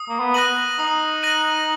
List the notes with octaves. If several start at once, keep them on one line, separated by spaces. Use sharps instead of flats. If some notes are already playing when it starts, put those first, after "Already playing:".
Already playing: D#6
A#3
B3
F#6 A#6 D#7 F#7
D#4 D#6
F#6 A#6 D#7 F#7